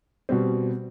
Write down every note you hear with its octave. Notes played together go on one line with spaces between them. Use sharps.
B2 G3 C4